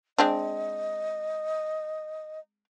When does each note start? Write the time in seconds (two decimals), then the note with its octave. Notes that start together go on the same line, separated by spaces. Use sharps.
0.18 G#3 C4 D4 D#5